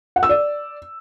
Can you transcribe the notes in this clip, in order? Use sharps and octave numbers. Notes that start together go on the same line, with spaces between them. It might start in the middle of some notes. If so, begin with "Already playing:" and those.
F#5
E6
D5